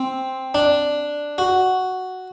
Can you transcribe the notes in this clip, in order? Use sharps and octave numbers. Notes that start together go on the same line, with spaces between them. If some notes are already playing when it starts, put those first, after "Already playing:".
Already playing: C4
D4
F#4